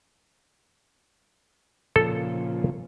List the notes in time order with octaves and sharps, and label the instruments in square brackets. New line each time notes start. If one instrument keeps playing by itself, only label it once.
[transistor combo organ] A#2 C#3 F3 [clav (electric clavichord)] A4